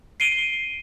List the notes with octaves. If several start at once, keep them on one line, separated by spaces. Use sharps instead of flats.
C7 D7 D#7 G7